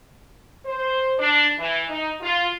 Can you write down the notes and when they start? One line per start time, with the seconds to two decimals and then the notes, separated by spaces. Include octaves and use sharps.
0.65 C5
1.18 D4
1.58 E3
1.89 D#4
2.22 F4